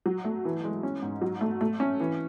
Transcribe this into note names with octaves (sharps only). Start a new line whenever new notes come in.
F#3
A3
E3
G#3
C#4
G#2
F#3
A3
A3
C#4
E3